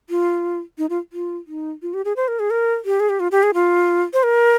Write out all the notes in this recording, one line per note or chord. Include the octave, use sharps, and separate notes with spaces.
F4
D#4
F4
F4
D#4
F4
G4
G#4
C5
A#4
G#4
A#4
G4
G#4
G4
F4
G4
G#4
F4
C5
A#4